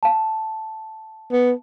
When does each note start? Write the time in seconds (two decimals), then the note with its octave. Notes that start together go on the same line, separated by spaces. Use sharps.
0.03 F5 A5
1.32 B3